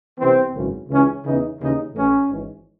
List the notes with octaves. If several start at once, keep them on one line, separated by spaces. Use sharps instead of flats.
C2 C3 E3 C4
G#1 F#2 C#3 E3
C#2 C#3 E3 C#4
E2 C#3 E3 D#4
D#2 C#3 E3 D#4
A1 A2 E3 C#4
G#1 G#2 E3